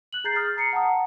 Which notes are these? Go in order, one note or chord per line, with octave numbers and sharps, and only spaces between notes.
F#6 F#7
G#4 A#5 G6 A6 C7
D#6 F6 A6
A#5 C7 C#7
F#5 A5 A#5 D#6